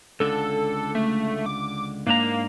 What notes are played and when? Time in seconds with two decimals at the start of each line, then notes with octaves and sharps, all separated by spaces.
0.20 C#2 D3 A4
0.95 A3
1.46 D6
2.07 G#2 A#3 D4 A#5